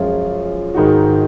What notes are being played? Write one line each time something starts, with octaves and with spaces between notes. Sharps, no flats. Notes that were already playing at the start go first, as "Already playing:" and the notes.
Already playing: F#2 F3 G#3 C#4 F4
G#2 D#3 G#3 D#4 F#4